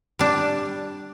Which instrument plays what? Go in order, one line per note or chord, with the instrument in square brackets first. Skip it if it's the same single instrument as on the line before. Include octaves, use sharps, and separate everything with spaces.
[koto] G3 D4